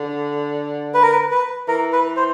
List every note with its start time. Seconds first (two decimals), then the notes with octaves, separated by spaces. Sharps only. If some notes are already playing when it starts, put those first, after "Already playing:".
Already playing: D3
0.94 B4
1.03 A#4
1.11 B4
1.31 B4
1.68 E3 A#4
1.93 B4
2.17 C5